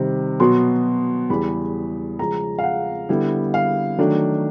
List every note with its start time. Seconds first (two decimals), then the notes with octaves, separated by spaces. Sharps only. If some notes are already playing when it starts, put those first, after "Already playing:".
Already playing: C3 D#3 G3 C4
0.40 B2 F#3 B3 C6
1.30 E2 C#3 E3 G3 B5
2.19 C#3 F3 G#3 A#5
2.59 F5
2.64 F#5
3.09 D3 G3 B3 E4
3.54 F5
3.98 D#3 F#3 A3 D4